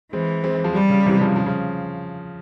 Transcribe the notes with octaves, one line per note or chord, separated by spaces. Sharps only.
E3 G#3 C4
G#3 C4
F3 G#3
G3
C#3
C3 E3
C#3 F3
C#3 F3
C#3